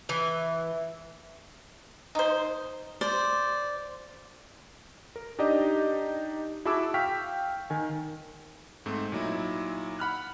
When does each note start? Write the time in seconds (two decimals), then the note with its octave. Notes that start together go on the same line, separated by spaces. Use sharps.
0.09 E3
2.15 D#4 C5
3.01 C5 D5
5.16 A#4
5.39 D4 D#4 G4 D5 D#5
6.65 E4 F#4 G#4 A5 D6 E6
6.94 F5 G5 C#6 F6 B6
7.70 D#3 G#5
8.86 G#2 A3 C4
9.12 A#2 F#3 D#4 E4
9.99 F#5 B5 F6 F#6